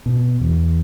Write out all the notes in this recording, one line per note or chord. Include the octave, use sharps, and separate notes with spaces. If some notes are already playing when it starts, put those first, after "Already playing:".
B2
E2